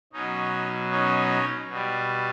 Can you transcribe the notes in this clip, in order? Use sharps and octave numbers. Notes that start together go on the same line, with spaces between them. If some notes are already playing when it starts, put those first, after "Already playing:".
B2 F#3 C#4 D#4
C#4 D#4
B2 G3